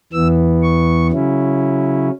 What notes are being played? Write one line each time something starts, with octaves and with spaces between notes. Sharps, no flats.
E2 E3 B3 E6
C#6
C#3 F#3 C#4 E4